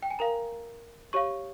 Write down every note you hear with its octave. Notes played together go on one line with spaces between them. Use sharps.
G5
G#5
A#4 F5 A#5
G4 C#5 F5 C#6